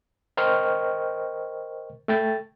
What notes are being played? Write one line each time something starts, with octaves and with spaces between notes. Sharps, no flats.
A#4 C5 D#5 G5 C#6 F6
A3 G5 A6